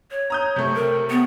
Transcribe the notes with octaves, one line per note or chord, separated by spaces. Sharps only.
C#5
A#5 D#6 G6
C3 A3
A#4
B3